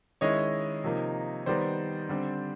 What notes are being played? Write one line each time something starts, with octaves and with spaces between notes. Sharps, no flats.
D#3 G#3 C#4 E4 C#5 D#5
C3 F3 A#3 D#4
D#3 G3 B3 D#4 C5 D5
D3 G3 C4